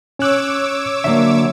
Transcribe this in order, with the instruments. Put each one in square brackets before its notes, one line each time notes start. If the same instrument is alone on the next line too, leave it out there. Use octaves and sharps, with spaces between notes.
[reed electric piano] C#4 F#6 [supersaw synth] C#5 D6 E6
[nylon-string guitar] D3 F#3 A#3 [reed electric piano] E5